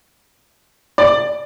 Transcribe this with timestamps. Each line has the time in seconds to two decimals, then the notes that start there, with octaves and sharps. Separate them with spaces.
0.98 D5